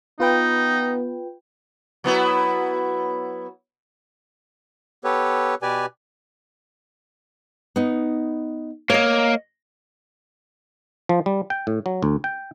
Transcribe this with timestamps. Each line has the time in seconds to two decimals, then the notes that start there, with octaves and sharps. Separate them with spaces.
0.20 B3 D#4 F4 B4 G5
2.04 F#3 B3 E4
5.04 B3 G4 A4 B4 C#5
5.62 B2 G4 B4 D5 G#5
7.76 B3 D#4
8.90 A#3 C#5 D#5
11.09 F3
11.26 G3
11.50 G5
11.67 A2
11.86 F#3
12.03 D2
12.24 G5